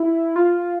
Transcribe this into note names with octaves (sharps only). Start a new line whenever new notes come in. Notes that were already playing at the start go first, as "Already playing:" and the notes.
Already playing: E4
F4